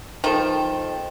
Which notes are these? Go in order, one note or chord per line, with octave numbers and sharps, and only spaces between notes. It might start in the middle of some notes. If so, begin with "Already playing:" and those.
D#3 F3 A4 G5